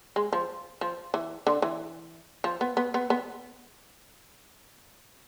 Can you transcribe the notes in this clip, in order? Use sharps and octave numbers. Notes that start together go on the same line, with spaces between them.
G#3
F3
F3
E3
D3
E3
F3
B3
B3
B3
B3